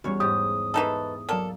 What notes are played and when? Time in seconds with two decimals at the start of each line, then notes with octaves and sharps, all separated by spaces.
0.04 E2 G3 C#4 F#4 C#5
0.20 G#2 G4 D#6
0.74 E3 D#4 E4 A4
1.29 F#3 A#3 A4 D5 F5